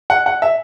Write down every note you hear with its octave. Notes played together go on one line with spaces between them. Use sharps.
F#5
F#5
E5